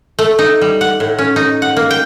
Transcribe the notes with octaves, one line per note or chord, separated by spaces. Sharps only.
A3
D#4
G3
F#5
A2
C#4
D#4
F#5
A#3
G5